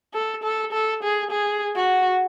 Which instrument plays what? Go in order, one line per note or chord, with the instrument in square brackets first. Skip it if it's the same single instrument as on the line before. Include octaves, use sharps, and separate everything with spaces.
[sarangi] A4
A4
A4
G#4
G#4
F#4